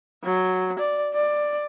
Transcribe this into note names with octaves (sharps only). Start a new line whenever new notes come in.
F#3
D5
D5